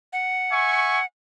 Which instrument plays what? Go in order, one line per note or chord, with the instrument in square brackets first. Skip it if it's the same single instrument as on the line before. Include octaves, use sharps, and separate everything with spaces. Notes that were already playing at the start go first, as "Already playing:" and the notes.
[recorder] F#5
[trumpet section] E5 G#5 C#6